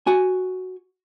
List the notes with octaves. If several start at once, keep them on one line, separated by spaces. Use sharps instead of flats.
F#4 G#5